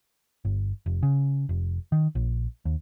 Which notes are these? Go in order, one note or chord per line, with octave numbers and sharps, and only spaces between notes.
G1
F1
C#3
F1
D#3
A#1
D#2